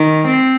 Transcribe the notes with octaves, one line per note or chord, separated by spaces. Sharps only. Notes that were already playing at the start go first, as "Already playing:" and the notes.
Already playing: D#3
C4